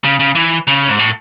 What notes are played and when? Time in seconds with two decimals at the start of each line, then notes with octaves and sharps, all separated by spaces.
0.04 C#3
0.19 C#3
0.35 E3
0.67 C#3
0.88 G#2
0.99 A2